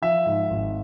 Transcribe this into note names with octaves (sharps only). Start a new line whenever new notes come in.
F3 E5
G#2
G#1